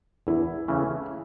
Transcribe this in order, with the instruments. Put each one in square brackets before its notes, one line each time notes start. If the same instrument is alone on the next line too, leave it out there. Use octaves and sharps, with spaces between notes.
[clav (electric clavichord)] E2 [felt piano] E4
[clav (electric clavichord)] C#3 E3 A3 C#4